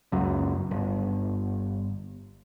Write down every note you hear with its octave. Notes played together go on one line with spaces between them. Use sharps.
C#2 F#2
G1